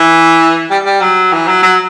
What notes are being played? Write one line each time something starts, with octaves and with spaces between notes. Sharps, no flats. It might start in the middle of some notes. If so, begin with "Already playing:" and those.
Already playing: E3
G3
G3
F#3
E3
F#3
F#3